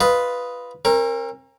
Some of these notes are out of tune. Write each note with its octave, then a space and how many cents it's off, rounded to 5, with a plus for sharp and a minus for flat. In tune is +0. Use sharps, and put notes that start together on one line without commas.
F4 +0 B4 +0 D#5 +0
C4 +45 A#4 +0